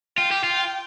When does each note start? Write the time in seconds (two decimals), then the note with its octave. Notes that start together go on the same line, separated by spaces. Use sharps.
0.18 F4 G5
0.32 G4
0.44 F4